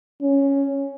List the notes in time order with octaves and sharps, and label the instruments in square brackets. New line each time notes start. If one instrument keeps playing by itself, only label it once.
[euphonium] C#4